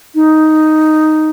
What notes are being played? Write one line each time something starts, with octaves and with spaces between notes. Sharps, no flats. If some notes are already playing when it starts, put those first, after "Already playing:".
D#4